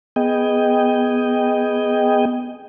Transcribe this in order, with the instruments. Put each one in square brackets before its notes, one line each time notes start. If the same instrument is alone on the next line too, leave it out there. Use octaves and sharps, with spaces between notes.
[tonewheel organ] B3 G#4 D#5 G5